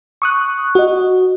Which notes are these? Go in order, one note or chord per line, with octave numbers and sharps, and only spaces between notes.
C#6 D#6 F#6
F#4 D#5